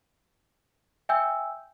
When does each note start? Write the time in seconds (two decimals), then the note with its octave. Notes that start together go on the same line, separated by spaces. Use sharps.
1.09 E5 G5 G#5 E6 G6